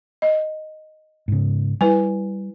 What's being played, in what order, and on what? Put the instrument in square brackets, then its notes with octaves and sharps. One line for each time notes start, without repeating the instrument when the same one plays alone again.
[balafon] D#5
[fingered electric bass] G#2 C#3
[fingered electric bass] G3 [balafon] E4 B4 G#5